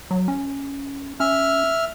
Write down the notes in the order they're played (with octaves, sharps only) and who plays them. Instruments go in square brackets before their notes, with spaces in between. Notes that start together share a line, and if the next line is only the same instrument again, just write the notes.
[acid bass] F#3
C#4
[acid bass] C#4 [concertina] E5 F6